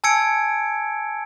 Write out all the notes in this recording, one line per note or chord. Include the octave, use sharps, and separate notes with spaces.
G#5 A5 E6 G#6 C#7 D7